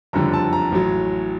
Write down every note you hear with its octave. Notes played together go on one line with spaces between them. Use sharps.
F#1 F2 D3 G3 A#5
A5
A#5
A1 A2 F#3